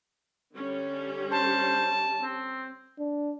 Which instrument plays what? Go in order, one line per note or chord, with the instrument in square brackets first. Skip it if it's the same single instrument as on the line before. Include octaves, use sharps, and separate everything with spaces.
[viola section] D3 G3 C#4
[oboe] C5 [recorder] A5
[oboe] C4
[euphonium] D4